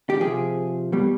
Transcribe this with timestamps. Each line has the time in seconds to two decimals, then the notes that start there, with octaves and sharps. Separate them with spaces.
0.10 G4
0.21 C3 F3 G#4
0.92 B2 G3